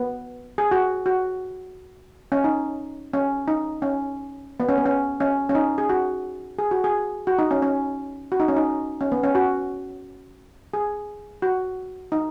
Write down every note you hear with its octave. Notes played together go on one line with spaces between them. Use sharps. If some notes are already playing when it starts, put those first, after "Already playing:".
Already playing: B3
G#4
F#4
F#4
C#4
D#4
C#4
D#4
C#4
B3
C#4
B3
C#4
C#4
C#4
D#4
G#4
F#4
G#4
F#4
G#4
F#4
D#4
C#4
C#4
F#4
D#4
C#4
D#4
C#4
B3
C#4
F#4
G#4
F#4
D#4